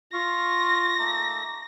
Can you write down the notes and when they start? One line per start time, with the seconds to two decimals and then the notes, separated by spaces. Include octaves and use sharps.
0.13 F4 F5 C#6 A#6
0.98 A3 A#3 D#4